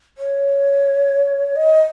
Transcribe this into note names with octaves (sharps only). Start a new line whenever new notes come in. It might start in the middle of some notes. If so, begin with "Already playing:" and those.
C#5
D#5